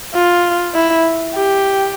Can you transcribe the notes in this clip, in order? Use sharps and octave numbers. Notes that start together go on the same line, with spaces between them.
F4
E4
G4